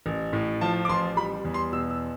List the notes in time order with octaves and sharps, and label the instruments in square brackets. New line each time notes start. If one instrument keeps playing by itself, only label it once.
[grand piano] A1
A2
F3 A5
D6
A1 C6
G3 B5
E2
C6
B2 E6
E6